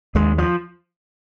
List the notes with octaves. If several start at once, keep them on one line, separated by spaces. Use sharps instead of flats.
D#2 G#3
F3